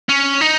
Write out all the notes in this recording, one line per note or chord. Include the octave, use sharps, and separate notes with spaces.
C#4
D#4